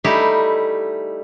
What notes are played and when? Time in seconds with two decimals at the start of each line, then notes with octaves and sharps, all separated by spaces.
0.04 G3 A3 D#4 E4 G4